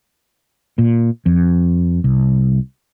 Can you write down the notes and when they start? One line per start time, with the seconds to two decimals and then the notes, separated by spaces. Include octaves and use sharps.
0.78 A#2
1.26 F2
2.04 C2